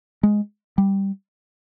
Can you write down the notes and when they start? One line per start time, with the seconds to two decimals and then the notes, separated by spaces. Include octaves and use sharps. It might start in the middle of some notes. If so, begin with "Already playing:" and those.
0.23 G#3
0.78 G3